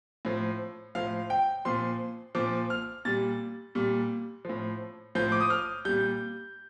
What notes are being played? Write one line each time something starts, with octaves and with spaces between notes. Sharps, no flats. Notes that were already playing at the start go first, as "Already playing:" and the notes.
A2 F3
A2 F3 F5
G5
A#2 F3 C6
A#2 F3 D6
F6
A#2 G3 A6
A#2 G3
A2 F3
A2 F3 G6
D6
D#6
F6
A#2 G3 G6